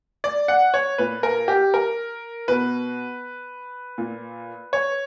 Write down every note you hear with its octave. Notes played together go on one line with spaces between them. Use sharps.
D5
F#5
C#5
A#2 B4
A#4
G4
A#4
B2 B4
A#2
C#5